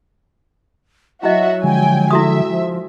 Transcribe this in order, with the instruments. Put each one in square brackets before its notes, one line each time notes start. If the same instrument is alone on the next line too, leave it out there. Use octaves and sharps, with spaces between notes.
[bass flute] F#3 [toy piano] E4 D#5 [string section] F#4 E5
[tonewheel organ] D3 F3 G#3 [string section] G5 G#5
[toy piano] E4 F#4 D#6 [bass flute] A4 [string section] E5
[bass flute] F3